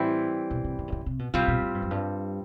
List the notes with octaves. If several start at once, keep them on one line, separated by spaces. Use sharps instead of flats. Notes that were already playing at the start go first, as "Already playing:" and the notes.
Already playing: A2 E3 G3 C4 E4
B2
C3
C#3
C3
C#3
C3
B2
C3 G3 C4 F4
B2
A2
G2
F#2
G2